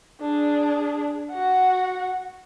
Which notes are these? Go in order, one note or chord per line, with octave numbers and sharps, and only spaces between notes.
D4 G#4
F#4 F#5